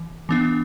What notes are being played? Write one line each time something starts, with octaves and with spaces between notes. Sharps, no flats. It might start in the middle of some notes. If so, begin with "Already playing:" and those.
Already playing: E3
E3 B3 D4